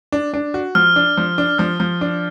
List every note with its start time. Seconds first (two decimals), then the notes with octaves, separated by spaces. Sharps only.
0.12 D4
0.34 D4
0.54 F#4
0.75 F3 F6
0.96 D4
1.17 F3
1.38 D4
1.58 F3 F6
1.80 F3
2.01 D4